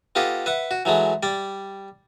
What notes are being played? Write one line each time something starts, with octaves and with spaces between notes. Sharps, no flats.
B3 F4 G4 A4 D#5
B4 E5 F#5
F#4
E3 F#3 G#3 A3
G3 D5